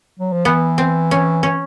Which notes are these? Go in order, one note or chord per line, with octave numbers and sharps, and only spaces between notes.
F#3
F3
E3 B3
C4
C#4
C#4